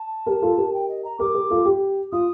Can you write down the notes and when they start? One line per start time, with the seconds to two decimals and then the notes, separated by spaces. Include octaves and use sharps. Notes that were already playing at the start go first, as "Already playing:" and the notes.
Already playing: A5
0.26 G4 A#4
0.42 F4 A4
0.57 G4 A#4
0.73 G5
0.89 D#5
1.04 A#5
1.19 G4 A#4 D6
1.34 G4 A#4
1.50 F4 A4
1.65 G4
2.12 F4 D#6